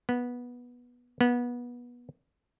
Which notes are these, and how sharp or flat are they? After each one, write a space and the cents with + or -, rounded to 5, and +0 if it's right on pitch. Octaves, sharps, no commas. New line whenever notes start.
B3 -15
B3 -25